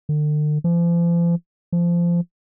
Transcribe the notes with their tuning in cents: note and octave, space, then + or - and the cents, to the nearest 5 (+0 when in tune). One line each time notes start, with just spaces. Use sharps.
D3 +40
F3 -40
F3 -20